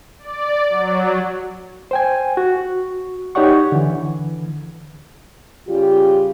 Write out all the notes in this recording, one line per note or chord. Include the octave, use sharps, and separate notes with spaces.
D5
F#3
C5 G5 G#5
F#4
D#4 G4 C#5 D5 F#5 C#6
D3 E3
C#3 G3 F4 G4